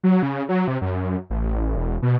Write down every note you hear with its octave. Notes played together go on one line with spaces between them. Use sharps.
F#3
C#3
F#3
C3
F#2
A1
E1
B2